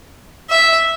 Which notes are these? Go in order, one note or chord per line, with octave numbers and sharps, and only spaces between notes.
E5